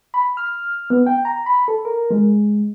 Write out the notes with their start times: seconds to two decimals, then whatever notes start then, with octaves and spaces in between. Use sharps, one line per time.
0.14 B5
0.37 F6
0.90 B3
1.07 G5
1.25 A#5
1.46 B5
1.68 A4
1.85 A#4
2.11 G#3